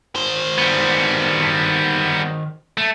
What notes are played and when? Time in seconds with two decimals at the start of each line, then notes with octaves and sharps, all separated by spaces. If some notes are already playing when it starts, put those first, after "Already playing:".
0.15 D#3 C5
0.58 G3 B3
2.78 A3